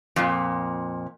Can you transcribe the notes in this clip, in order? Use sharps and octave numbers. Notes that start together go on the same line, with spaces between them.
F2 A#2